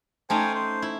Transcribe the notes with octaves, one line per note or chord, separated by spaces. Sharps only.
A3 C#4 D#4 C5 G5 G#5
C5
E4